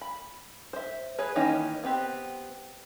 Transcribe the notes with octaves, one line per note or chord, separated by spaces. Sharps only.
B5
C5 E5
G#4 B4 C#5
D#3 E3 A#3 C#4 D#4
B3 C4 G4